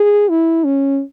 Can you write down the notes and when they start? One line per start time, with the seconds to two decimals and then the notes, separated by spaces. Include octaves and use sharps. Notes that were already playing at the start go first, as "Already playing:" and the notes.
Already playing: G#4
0.29 E4
0.64 C#4